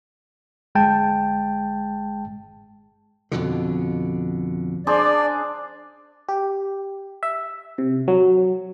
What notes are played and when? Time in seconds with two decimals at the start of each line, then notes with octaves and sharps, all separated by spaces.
0.75 G1 G#3 G5 A5
3.31 F2 B2 D3
4.87 D4 G#4 C5 D5
6.28 G4
7.23 E5
7.78 C3
8.08 F#3